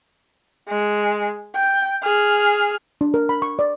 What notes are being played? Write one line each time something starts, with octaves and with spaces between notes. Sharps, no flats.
G#3
G5
G#4 F6
D4
A#4
B5
C#6
D5